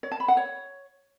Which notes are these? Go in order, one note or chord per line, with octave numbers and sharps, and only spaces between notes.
C#5
A5
B5
F#5
C#5